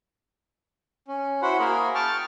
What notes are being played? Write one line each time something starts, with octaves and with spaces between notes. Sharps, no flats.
C#4
E4 F#4 C5 F#5 B5
A#3 G#4 A#4 B5
G5 A5 C#6 F6